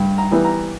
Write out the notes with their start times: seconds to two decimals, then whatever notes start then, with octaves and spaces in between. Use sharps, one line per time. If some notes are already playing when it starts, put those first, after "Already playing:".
Already playing: G2
0.18 A#5
0.31 E3 G3 B3
0.45 A#5